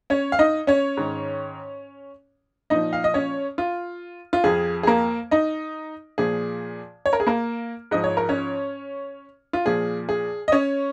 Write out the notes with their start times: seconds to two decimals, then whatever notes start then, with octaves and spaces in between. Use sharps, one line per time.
0.10 C#4 C#5
0.32 F5
0.39 D#4 D#5
0.67 C#4 C#5
0.97 G#2 D#3
2.70 A#2 F3 D#4 D#5
2.93 F5
3.04 D#5
3.14 C#4 C#5
3.58 F4
4.33 F4
4.44 F2 F3 G#4
4.83 G#4
4.87 A#3 A#4
5.31 D#4 D#5
6.18 A#2 F3 G#4
7.06 C#5
7.13 A#4
7.20 G#4
7.27 A#3 A#4
7.91 G#2 F3 D#5
8.04 C#5
8.17 A#4
8.29 C#4 C#5
9.53 F4
9.66 A#2 F3 G#4
10.09 G#4
10.48 D#5
10.52 C#4 C#5